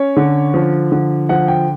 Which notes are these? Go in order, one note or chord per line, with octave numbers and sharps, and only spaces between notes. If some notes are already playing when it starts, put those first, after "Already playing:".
Already playing: C#4 C#5
D3
F3
D3
F3 F#5
G5